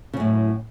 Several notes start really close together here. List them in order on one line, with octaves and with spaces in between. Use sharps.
C#3 F#2 A2